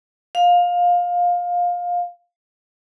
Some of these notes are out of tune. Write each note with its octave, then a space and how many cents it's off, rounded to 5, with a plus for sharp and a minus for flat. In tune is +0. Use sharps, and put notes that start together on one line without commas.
F5 +20